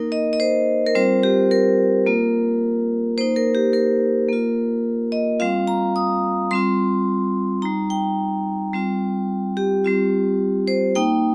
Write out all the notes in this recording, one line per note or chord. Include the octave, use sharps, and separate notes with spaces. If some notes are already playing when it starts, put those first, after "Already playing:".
Already playing: A#3 D#4 A#4
D#5
D#5
C5
A#4
G3 C4 F4 C5
G4
A#4
A#3 F4
A#3 D#4 C5
A#4
G4
A#4
A#3 F4
D#5
G3 C4 F4 F5
A#5
D#6
G3 C4 F4 C6
G3 D#4 A#5
G5
G3 C4 F4
G4
G3 C4 F4
C5
A#3 D#4 G5